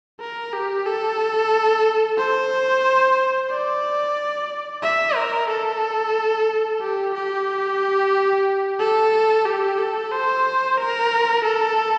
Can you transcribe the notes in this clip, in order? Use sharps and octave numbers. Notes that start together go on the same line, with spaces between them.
A#4
G4
A4
C5
D5
E5
A#4
A4
G4
G4
A4
G4
A4
C5
A#4
A4